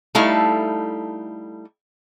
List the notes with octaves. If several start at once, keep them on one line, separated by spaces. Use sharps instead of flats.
G3 A3 D#4 E4 A4 F5